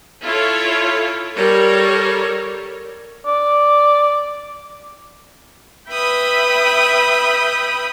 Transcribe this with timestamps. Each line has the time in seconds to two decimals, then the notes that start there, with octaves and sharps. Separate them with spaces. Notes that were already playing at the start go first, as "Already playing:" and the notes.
0.23 E4 F4 A4 C#5
1.35 G3 A4 A#4 C#5
3.26 D5
5.90 B4 E5 G5 B5 D#6